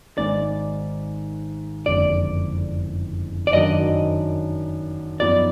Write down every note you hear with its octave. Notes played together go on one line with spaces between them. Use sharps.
G#1 G#2 D#3 G#3 D5
F#1 F2 D3 G#3 D4 D5
D5
F#2 D#3 F#3 D4 D#5
F#2 F3 B3 D#4 D5